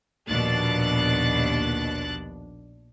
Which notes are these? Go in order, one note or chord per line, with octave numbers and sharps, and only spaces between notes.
A#1 D#2 B2 D4 F#6 A6